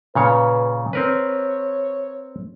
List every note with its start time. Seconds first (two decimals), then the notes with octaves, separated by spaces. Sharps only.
0.15 A#2 C#3 B4 C#5
0.93 C4 A#4 B4 C#5